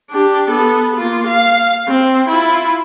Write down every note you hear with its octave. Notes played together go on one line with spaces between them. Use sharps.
D4 G4
B3 A4
A#3 F4
F5
C4
E4 F4